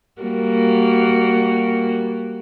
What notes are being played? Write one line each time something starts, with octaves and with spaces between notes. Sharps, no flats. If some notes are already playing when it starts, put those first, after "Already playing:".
G3 A#3 F#4